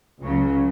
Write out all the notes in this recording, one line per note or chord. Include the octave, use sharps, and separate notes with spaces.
C#2 C#3 F#3